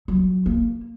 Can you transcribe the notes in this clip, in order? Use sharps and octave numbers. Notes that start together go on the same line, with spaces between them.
F#3
A#3